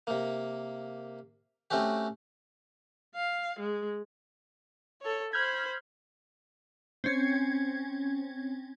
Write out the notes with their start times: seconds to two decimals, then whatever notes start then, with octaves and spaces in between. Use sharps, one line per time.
0.07 C3 A#3
1.70 A3 C4 C#4 F#4 G4
3.15 F5
3.60 G#3
5.02 A4 C#5
5.33 C5 B5 F6 G6 G#6
7.04 C4 C#4 G#6